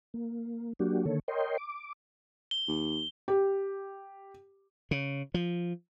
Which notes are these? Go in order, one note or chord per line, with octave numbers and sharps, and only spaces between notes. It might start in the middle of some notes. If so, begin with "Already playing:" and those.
A#3
F#3 A#3 D4 F#4 G4
D3 D#3 A#3 A4 C#5
A#4 C#5 D#5 G5 C6
D6
G7
D#2
G4
C#3
F3